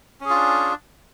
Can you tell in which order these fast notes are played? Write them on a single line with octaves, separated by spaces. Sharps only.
C#4 G#4 F4 D4